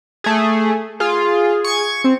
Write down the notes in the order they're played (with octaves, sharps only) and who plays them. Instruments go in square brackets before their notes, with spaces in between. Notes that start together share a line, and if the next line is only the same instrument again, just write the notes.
[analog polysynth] A3 G#4
[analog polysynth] F4 [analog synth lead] G#4
[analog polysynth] C#6 G#6
[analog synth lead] C4